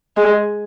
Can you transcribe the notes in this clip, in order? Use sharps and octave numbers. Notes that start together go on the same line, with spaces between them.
G#3